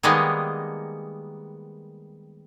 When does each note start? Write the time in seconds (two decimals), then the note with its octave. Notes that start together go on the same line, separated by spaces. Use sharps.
0.03 D#3 G3 G#3 A#3 B3